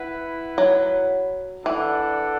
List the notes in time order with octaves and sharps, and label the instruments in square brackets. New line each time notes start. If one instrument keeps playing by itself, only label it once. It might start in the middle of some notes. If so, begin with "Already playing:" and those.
Already playing: [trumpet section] E4 B4 F#5
[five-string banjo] F#3
[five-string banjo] E3 [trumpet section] D4 A4 D5 F#5